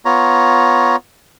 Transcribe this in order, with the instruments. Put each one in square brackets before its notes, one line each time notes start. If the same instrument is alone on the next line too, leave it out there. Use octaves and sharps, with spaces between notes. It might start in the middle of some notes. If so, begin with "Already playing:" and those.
[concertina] B3 F4 C#5 A#5